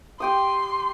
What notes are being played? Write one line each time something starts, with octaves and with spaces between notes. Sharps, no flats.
G4 G5 C6 D#6